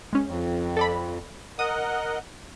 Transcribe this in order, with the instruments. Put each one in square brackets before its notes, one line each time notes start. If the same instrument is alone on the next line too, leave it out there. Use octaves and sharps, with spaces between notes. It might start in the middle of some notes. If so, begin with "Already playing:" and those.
[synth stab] G#3 C#4
[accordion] F2
[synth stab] A4 D5 B5
[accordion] A#4 D#5 F#5 [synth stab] D#6